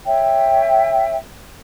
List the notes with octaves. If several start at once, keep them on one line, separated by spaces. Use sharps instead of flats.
C#5 E5 G5